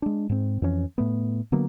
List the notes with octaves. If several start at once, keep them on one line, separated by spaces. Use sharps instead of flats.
G#3 D4
G#2 C4
F2 E3 C#4
A2 A3 B3
D3 F#3 A#3 B3